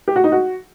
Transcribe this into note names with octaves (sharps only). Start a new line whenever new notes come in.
G4
F#4
D#4
F#4